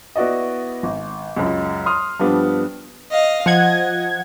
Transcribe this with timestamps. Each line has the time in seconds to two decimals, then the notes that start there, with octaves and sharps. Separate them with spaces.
0.16 B3 E4 F#4 D5 D#5
0.83 G#1
1.37 C#2 F#2
1.86 C6 D#6 F6
2.20 G2 F3 G3 B3 D4
3.11 D#5 F5
3.46 F3 D#5 F#5 G#6